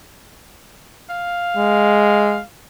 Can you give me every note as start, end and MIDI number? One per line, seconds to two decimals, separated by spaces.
1.10 2.43 77
1.57 2.40 56